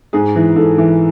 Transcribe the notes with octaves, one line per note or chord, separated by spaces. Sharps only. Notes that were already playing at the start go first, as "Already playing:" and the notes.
G#2 G#4
E3
G#2 A4
E3